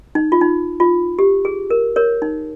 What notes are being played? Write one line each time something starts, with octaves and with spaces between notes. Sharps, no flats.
D#4
F4
D#4
F4
G4
G#4
A#4
A#4 C#5
D#4